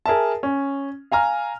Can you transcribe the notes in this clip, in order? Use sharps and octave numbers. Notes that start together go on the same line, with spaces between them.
G#4 A#4 E5 A5
C#4
F5 G#5 A#5 F6